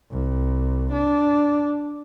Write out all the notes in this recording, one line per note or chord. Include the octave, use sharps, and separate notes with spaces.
C2
D4